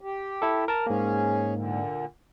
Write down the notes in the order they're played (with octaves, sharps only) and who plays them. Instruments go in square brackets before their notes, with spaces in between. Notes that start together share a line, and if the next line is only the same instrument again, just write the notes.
[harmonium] G4
[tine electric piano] E4 A4
A#4 A5
[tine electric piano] G#2 A#3 [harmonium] C#4 G#4
[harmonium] A#2 D3